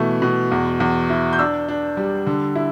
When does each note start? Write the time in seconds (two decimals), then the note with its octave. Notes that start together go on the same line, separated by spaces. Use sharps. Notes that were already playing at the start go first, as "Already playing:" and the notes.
Already playing: B2 E3 A3
0.22 B2
0.51 E2
0.80 E2
1.10 E4
1.33 G6
1.39 D4 E6
1.68 D4
1.97 G3
2.27 D3
2.55 E4